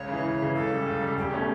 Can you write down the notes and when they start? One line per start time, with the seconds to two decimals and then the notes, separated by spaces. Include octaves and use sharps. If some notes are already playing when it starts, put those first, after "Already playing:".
Already playing: C#2 C#5
0.08 C#3 E3
0.24 C#2
0.40 C#3 E3
0.55 C#2 A4
0.71 C#3 G3
0.86 C#2
1.01 C#3 G3
1.17 E1 G4
1.33 B2 A3 C#4